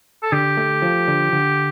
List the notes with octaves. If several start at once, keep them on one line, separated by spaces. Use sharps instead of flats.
A4
D3 G4
A3
F3
D3
D3